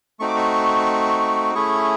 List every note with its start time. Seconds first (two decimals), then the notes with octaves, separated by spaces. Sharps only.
0.20 A3 C4 D#4 F#4 C#6
0.28 D6
0.36 C#6
1.55 A3 C#4 E4 G#4 C#6